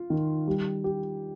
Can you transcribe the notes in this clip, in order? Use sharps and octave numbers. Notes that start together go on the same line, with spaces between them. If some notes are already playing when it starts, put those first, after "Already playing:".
Already playing: F4
D#3
G3
G4